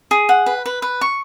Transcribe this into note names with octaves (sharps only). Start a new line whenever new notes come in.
G#4
F#5
B4
B4
B4
C#6